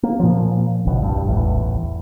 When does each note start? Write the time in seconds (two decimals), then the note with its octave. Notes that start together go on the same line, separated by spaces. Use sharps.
0.03 A#3
0.20 A#2 F3
0.85 D1 G#1 C#2 B2
1.02 C2 G2
1.26 D#1 A1 E2